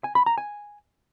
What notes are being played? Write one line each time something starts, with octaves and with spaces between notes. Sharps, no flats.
G#5
B5
A#5
G#5